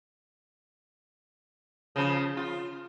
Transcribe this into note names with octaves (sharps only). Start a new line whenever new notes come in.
C#3 F3
F4